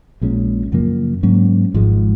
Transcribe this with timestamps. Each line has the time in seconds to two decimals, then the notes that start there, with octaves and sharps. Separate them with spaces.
0.21 A#1 A#2 G#3 C#4
0.72 F#2 C#3 F3 A#3
1.23 G#2 F#3 A#3 C#4
1.74 G#1 G#2 F3 G#3